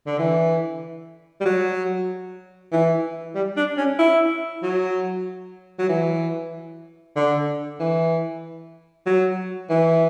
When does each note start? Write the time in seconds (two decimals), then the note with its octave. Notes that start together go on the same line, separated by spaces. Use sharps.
0.07 D3
0.19 E3
1.40 G3
1.45 F#3
2.72 E3
3.35 G3
3.57 D4
3.77 C#4
3.99 E4
4.63 F#3
5.79 F#3
5.89 E3
7.16 D3
7.80 E3
9.06 F#3
9.70 E3